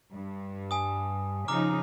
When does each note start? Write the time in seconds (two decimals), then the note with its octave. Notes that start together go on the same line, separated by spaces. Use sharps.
0.12 G2
0.71 G#5 D#6
1.48 C#3 F3 D#4 A#5 D6 F6